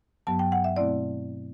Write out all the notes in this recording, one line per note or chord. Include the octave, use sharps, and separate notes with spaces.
G2 F#3 B3 A5
G5
F#5
E5
B2 A3 C4 E4 D5